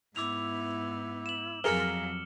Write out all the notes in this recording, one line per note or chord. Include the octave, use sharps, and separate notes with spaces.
G#2 B3 E4 D6 E6 F7
E7 F#7
F2 F#3 G#4 A#4 F5 F6 C#7 G7